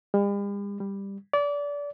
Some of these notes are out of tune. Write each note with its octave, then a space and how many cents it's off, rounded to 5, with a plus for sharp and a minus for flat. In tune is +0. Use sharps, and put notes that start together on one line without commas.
G3 +45
G3 +10
D5 -25